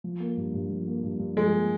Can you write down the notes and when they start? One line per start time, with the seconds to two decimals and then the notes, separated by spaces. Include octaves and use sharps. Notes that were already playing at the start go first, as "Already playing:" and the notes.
0.04 F3
0.20 A#3
0.37 G2
0.54 G2
0.71 F3
0.87 A#3
1.03 G2
1.20 G2
1.36 F3 G#3
1.53 A#3